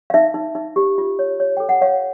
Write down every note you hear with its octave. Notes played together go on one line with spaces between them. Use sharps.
F5
D#4 E5
D#4
D#4
G4
F4
C#5
C#5
A4 G5
F#5
C#5 F5